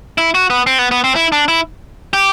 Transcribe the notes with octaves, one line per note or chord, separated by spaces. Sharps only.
E4
F#4
B3
C4
B3
B3
C4
E4
D4
E4
G4